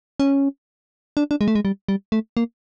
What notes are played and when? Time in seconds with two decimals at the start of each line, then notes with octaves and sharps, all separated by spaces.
0.20 C#4
1.17 D4
1.31 D4
1.41 G#3
1.48 A3
1.55 G#3
1.65 G3
1.89 G3
2.12 A3
2.37 A#3